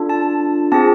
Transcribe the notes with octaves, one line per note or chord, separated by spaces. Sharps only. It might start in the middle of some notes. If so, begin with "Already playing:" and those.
Already playing: D4 F4 A4
A5
C4 F4 G#4 A5